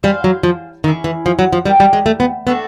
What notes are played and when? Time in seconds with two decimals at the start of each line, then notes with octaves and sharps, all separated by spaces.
0.03 G3 G#4 C5 F5
0.24 F#3
0.43 F3
0.84 D#3 A#3 C#4 E4 G#4
1.04 E3
1.26 F3
1.39 F#3
1.53 F3
1.65 G3 E4 G4 A#4
1.80 G3
1.93 G#3
2.06 A3
2.20 B3
2.47 A3 B3 D4 F#4 A4